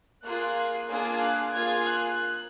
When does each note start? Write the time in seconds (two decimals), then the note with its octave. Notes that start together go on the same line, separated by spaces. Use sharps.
0.24 A#3 F4 G#4 F#6
0.90 A#3 D4 F4 G#4
1.22 F#6
1.54 A#3 F4 G#4 G#6
1.87 F#6